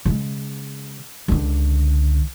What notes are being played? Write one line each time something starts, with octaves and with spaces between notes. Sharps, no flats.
C#3 G#3
C#2 D3